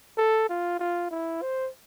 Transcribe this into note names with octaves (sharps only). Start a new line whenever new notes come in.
A4
F4
F4
E4
C5